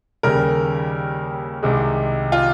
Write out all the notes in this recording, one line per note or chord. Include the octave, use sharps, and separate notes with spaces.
D#2 C#3 G3 A#4
C2 C3 D#3 G#3
F4